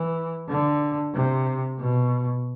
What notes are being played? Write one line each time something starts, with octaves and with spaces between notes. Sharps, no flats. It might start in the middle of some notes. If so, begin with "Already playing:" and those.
Already playing: E3
D3
C3
B2